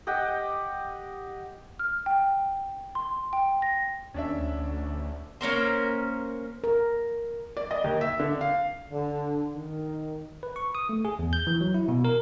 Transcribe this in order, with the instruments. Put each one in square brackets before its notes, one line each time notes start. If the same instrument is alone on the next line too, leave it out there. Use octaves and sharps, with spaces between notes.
[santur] G4 D#5 F#5 G5
[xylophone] F6
G5
C6
G5
A#6
[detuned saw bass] D#2 [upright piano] C#4 D4 E5
[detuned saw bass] D2
[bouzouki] A#3 C#4 A#4 C5
[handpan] A#4
[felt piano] D5
D#5
D#2
E5
D3
F5
[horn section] D3
D#3
[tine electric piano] B4
C#6
D#6
A3
G#4
E2
G6
E3
F#3
E4
B2
A#4